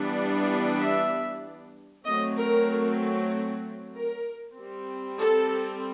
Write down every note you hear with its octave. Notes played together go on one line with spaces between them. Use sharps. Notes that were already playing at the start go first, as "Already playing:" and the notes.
Already playing: E3 G3 B3 D4
E5
F#3 A3 C4 D#5
A#4
A#4
G3 C4
A4